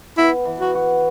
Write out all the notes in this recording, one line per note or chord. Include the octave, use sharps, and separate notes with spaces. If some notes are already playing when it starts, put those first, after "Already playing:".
B3 E4
E3
F#4
F#4